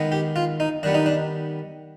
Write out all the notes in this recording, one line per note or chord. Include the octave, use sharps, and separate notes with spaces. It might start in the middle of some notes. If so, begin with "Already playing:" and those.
Already playing: D#3 G#3 B3
G4
F4
D#4
D#3 G3 B3 D4
D#4
D4